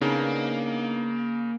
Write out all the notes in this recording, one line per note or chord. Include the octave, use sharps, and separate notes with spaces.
C#3 A#3 B3 D4 D#4